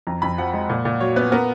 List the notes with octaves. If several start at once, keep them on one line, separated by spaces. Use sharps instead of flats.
F2 A#5
F2 B5
F3 F#5
G#3
A#2
A#2
F#3 C#5
B3 B4
B3 A#4